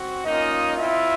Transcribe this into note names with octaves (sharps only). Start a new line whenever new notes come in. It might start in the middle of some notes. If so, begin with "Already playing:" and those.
Already playing: C4 F#4
A#3 C#4 D#4 F4 D#5
C4 E4 F4 E5